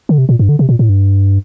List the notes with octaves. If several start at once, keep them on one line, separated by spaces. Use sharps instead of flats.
D3
C3
A#2
G2
D3
C3
A#2
A2
G2